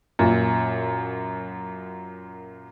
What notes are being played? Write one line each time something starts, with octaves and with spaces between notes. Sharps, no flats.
F#2 A#2